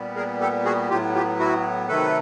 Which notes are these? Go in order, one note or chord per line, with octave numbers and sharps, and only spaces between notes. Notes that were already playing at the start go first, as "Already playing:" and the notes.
Already playing: A#2 G3 B3
G#4 A#4
G4 A4
F#4 G#4
A2 F#3 B3 F4 G4
F4 G4
E4 F#4
C3 D#3 F#3 A3 A4 B4